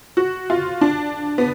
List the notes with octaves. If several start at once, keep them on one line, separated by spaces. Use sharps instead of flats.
F#4
F4
D4
B3